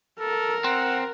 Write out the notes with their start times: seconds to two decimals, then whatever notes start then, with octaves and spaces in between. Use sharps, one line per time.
0.20 A4 A#4
0.64 C4 F#5